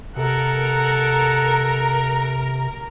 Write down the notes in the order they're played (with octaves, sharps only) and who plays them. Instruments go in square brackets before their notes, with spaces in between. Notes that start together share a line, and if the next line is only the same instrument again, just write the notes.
[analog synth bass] C3 [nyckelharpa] A4 F#5 [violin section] A#4